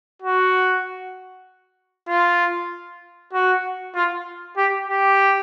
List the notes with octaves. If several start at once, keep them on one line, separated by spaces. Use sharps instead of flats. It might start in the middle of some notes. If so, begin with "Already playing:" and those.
F#4
F4
F#4
F4
G4
G4